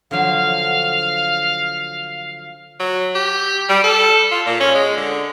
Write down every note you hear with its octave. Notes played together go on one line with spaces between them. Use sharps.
D3 F3 F#3 F5
F#3
G4
G3
A4
F4
A#2
C#4
G#3
D3